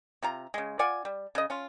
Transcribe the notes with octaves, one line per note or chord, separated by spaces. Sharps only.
C3 F4 A#5
C#3 G#3
F4 D5 F#5 G#5
G3
C#3 D#5
C#4 F4